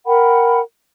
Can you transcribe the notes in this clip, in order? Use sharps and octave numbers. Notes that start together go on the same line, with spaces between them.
A#4 F#5 G5 B5